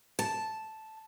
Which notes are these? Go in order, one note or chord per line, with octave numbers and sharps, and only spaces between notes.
A5